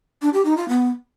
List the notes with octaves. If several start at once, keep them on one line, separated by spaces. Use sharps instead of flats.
D4
G4
D#4
F4
B3